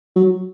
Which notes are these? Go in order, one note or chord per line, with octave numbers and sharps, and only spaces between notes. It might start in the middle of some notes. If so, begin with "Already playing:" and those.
F#3